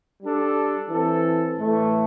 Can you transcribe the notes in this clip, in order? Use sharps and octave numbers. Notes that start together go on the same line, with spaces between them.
G3 D4 A4
E3 C4 A4
A2 E3 A3